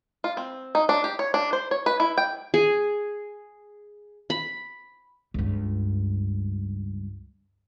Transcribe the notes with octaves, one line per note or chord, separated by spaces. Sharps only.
F4
C4
D#4
D4
G4
C#5
D4
C5
C#5
B4
E4
G5
G#4
B5
C#2 G2